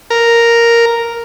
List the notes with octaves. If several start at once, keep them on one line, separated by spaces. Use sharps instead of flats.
A#4